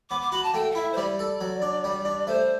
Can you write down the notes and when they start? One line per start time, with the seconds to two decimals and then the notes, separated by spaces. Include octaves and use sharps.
0.10 B3 D6
0.22 D6
0.32 F#4 B5
0.43 A5
0.54 A3 G5
0.71 F#5
0.75 E4 E5
0.92 C5
0.97 G3 D5
1.19 A4
1.41 F#3
1.62 D4
1.84 G3
2.05 D4
2.27 A3 C5